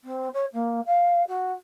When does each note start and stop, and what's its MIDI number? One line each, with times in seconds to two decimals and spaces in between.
0.04 0.29 60
0.34 0.45 73
0.53 0.81 58
0.86 1.23 77
1.28 1.53 66